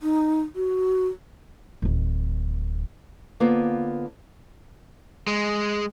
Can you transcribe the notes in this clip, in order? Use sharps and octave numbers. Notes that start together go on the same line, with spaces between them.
D#4
F#4
D1 D#3
D3 A#3 B3 F4 B4 C5
G#3